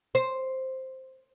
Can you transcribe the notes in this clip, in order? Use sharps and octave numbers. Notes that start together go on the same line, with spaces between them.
C5